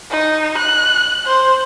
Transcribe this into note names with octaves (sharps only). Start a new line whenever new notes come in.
D#4
F#6
C5